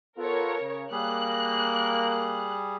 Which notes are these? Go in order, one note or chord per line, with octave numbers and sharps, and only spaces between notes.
B3 F4 A4 A#4 C#5
C#3
G3 A#3 G#4 F#6